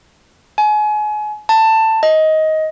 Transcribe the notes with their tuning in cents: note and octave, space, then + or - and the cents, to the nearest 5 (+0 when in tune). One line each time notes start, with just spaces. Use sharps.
G#5 +30
A5 +15
D#5 +15